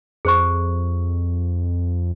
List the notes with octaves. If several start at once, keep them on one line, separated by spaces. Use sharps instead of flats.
F2 G#4 C5 C#6